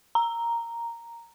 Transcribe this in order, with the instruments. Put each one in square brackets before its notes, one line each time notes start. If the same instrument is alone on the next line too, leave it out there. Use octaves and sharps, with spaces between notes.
[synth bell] A#5